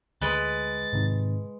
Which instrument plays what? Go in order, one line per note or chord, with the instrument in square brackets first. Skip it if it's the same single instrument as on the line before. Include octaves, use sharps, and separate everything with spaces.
[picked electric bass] D2 [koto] G#3 B4 [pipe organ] A6
[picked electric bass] G#2 C3 D#3